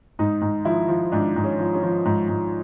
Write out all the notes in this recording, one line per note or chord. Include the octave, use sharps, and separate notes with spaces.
G#2 D#4
G#2
F3 E4
F3
G#2 D4
G#2
C#4
F3
C#4
F3
G#2
G#2